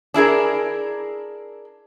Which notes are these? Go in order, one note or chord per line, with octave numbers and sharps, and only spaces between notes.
D4 E4 G#4 A#4